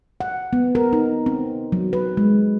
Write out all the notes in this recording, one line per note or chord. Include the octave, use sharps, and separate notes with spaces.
F#5
B3
A#4
D#4
C4
F#3
B4
G#3